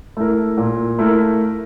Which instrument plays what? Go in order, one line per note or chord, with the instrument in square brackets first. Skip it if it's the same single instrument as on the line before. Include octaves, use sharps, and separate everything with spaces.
[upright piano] A3 E4 A#4
A#2
A3 E4 A#4